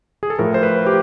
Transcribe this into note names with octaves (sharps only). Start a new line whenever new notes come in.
G#4
A4
A2 F3 A#4
C5
B4
G4